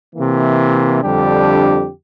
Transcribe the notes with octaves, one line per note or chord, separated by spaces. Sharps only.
C3 E3 A#3
F2 D3 G3 D4 G4